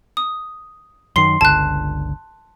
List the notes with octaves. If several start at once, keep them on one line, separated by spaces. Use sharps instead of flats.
D#6
F#2 D#3 C6 C7
G1 C#2 D3 A5 F#6